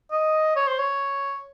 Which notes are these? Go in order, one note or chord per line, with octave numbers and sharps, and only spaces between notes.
D#5
C#5
C5
C#5